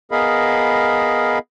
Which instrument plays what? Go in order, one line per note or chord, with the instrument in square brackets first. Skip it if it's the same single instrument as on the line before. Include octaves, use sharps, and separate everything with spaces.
[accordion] B3 G#4 A#4 D#5 F5 B5